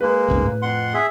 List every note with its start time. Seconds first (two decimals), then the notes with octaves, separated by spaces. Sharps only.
0.01 G#3 A#3 B4
0.28 G1 C#2 G#2
0.46 A2
0.62 F2 F#5 C6
0.94 G#4 E5